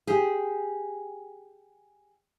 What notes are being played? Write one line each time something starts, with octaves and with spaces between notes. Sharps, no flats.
G4 G#4